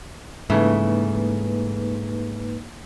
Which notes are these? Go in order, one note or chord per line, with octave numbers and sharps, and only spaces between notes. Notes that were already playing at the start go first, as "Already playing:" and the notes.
G#2 C#3 E3 A3 A#3 D#4 B4